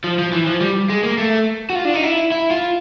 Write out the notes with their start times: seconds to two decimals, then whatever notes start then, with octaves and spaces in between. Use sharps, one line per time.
0.04 F3
0.19 F3
0.32 E3
0.47 F3
0.61 G3
0.89 G#3
1.03 A#3
1.18 A3
1.70 F#4
1.75 F4
1.85 D4
1.94 D#4
2.03 E4
2.32 E4
2.51 F4